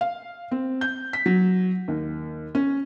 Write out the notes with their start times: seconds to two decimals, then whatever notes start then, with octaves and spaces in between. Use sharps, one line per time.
0.01 F5
0.51 C4
0.81 G6
1.13 B6
1.26 F#3
1.88 D#2
2.55 C#4